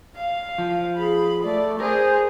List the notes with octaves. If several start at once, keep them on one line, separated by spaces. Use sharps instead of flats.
F5
F3
G#4 B5
A3 D5
G#4 A#4 C5